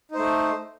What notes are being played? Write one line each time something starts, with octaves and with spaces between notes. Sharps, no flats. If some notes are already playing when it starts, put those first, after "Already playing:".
A3 D#4 C5